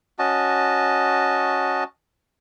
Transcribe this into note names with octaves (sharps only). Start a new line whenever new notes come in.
C#4 F#4 D#5 A5